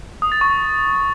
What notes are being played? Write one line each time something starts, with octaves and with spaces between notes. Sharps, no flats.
D#6
A6
C#6